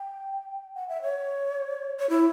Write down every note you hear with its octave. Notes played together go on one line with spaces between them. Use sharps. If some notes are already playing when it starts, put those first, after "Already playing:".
Already playing: G5
F#5
E5
C#5
C#5
E4